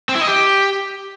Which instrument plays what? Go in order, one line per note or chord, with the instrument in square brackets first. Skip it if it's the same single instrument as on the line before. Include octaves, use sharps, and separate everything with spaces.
[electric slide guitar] C4
E4
D#5
G4